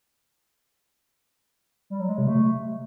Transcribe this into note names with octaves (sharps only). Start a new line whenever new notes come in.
G3
F#3
G#3
C3
A3